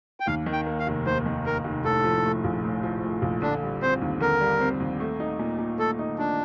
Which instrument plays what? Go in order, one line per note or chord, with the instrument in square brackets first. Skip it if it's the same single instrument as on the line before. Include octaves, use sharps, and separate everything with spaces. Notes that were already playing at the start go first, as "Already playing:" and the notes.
[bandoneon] G5
[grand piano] D#2 [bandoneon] F5
[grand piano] D#3
[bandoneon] G5
[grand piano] A#3
[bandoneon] F5
[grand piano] F1
[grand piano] D#2 [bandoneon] C5
[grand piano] D#3
[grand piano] A#3 [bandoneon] A#4
[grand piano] F1
[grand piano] A2 [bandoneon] A4
[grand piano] F3
A3
A#1
A2
F3
A3
A#1
[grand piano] D3 [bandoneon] D4
[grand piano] G3
[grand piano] C4 [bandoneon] C5
[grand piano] D#2
[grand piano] D3 [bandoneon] A#4
[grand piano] G3
C4
D#2
A3
D#4
A#2
A#2
[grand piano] A3 [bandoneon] A4
[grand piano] D#4
[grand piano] A#2 [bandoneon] D4